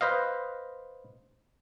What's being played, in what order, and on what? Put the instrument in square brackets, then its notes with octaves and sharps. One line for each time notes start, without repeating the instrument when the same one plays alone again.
[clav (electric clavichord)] B4 C5 D#5 F5